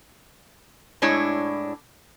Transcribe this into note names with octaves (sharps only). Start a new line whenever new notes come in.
A2 G#3 D4 E4 C#5